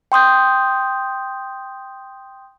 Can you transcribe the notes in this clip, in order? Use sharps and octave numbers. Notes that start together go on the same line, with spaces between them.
G5 C6 D#6 G6